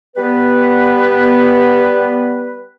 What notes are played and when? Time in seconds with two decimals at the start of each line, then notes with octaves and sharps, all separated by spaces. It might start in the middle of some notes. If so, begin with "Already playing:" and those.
0.17 G3 B3 B4